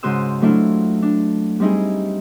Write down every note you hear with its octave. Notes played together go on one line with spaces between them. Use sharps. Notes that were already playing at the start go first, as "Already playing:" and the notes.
G#2 C#3 F#4 C5 D#6 E6
F#3 A3 D4 E4 F4
D4
G3 C4 D#4 E4 G#4